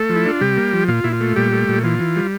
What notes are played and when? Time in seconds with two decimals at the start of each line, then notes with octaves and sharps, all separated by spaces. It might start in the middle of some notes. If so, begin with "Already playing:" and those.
Already playing: A3 A4
0.09 F3
0.16 E4
0.25 D4 F4
0.41 C3 G3 G4
0.57 A#3
0.73 F3
0.88 A#2 F4
1.04 A#2 E4
1.13 F4
1.21 A3
1.36 A#2 G3 G4
1.52 A3
1.68 A#2
1.84 E3 F4
1.99 E3
2.16 G3